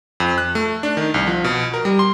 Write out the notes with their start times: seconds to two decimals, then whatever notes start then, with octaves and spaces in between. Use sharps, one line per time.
0.20 F2
0.38 F#6
0.55 A3
0.83 D4
0.97 D#3
1.14 C2
1.27 F3
1.44 B2
1.74 A#4
1.85 G3
1.99 C6